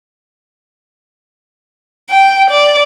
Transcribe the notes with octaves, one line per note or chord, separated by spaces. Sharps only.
G5
D5